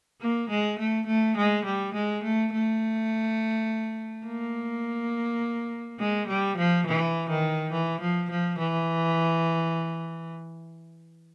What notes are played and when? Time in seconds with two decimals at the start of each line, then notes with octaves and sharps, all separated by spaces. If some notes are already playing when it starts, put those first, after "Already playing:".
0.21 A#3
0.50 G#3
0.79 A3
1.07 A3
1.37 G#3
1.65 G3
1.94 G#3
2.24 A3
2.53 A3
4.26 A#3
5.99 G#3
6.28 G3
6.57 F3
6.87 E3
7.30 D#3
7.73 E3
8.01 F3
8.31 F3
8.59 E3